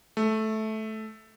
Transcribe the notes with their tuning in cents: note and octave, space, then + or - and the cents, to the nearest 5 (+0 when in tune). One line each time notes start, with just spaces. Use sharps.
A3 -10